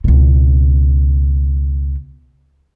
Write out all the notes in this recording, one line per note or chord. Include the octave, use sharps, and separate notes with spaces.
C#2 B2